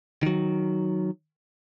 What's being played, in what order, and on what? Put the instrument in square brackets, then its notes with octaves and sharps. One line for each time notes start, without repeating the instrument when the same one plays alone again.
[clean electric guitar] D#3 F#3